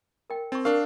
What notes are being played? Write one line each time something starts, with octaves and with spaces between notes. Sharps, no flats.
A#4 G5
C4 D#4 C#6
D4 A#4 F5 C#6